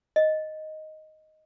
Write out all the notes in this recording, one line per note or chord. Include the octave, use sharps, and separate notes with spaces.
D#5